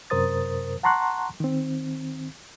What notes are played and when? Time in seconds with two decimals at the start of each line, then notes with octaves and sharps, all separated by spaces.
0.10 F#2 C3 A#4 C5 D#6 A6
0.83 F#5 A5 A#5 C6 C#6 F#6
1.40 D#3 C4